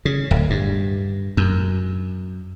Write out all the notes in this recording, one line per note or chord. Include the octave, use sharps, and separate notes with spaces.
C#3
D1
G2
F#2